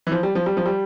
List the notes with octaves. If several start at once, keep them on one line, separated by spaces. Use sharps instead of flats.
E3
F3
G3
F3
G3
F3
G3